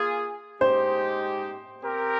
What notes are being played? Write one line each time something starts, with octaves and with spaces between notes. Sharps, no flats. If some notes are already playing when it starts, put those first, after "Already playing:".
Already playing: A#3 F4 G#4
G#3 D#4 G4 C5
C4 G4 A#4